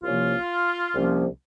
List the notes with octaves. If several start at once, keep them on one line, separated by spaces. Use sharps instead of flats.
C2 C3 F3 A#3 C#4 F4
C2 C3 F3 A#3 C#4